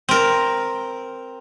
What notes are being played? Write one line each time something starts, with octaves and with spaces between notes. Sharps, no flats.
C4 A#4